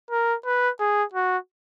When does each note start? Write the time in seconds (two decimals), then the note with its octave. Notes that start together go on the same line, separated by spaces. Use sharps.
0.11 A#4
0.46 B4
0.80 G#4
1.14 F#4